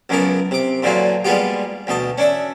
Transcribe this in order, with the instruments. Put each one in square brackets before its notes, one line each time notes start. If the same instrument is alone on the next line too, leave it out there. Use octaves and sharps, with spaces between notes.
[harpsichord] C#2 F#2 C#3 B3 A#4 A5
C3 D6
A#2 D3 E3 F#3 D4 F4
G3 G#3 A#3 B3 F4 G4
D2 B2 D#5 A5
C#4 D4 E5